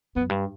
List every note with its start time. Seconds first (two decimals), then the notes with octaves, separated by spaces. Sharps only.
0.16 F#2 B3
0.29 G2